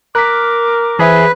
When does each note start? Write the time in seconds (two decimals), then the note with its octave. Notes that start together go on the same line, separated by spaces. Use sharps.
0.15 A#4 D6 F#6 B6
0.99 E3 G#4 B4 C5 E5